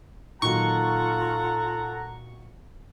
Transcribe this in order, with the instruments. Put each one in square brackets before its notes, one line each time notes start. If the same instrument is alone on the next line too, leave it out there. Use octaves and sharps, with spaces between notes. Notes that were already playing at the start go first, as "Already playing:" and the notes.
[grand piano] A#2 D#3 F#3 [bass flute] F4 [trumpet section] A4 F#5 A#5 [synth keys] C#6